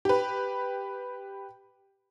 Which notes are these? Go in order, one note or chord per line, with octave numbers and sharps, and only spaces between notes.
G4 B4